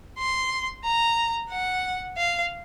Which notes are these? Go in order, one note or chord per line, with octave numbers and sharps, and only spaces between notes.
C6
A#5
F#5
F5